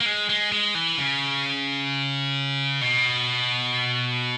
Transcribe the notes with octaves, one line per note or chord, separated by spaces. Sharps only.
A#3
G#3
G#3
G#3
E3
C#3
B2